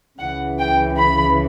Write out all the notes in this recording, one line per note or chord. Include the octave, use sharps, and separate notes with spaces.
C#2 C#3 E3 F#5
G5
B5